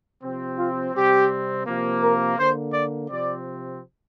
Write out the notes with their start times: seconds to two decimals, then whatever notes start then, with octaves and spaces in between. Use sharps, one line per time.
0.22 C3 F3 C4
0.58 F4
0.94 C3 G3 C4 G4
1.66 C3 F3 A#3
2.02 A#4
2.38 D3 A#3 C5
2.74 D5
3.10 C3 F3 C4 D5